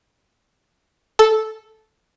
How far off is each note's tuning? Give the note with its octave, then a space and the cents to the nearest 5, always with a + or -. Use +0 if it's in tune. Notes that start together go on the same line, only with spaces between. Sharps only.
A4 -5